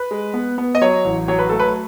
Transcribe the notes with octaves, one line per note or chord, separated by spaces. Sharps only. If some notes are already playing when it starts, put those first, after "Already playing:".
Already playing: B4
G#3
B3
B3
D#5
F#3 C#5
A1
F#3 C#5
B4
A3 A4
B4